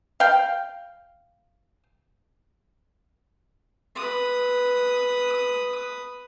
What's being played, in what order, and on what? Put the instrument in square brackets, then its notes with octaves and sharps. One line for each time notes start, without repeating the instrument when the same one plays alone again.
[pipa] F5 G5
[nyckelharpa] B4 D#6